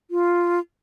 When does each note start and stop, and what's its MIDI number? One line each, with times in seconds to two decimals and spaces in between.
0.11 0.59 65